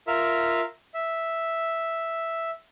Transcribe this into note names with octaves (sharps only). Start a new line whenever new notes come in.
F4 A#4 E5 F5
E5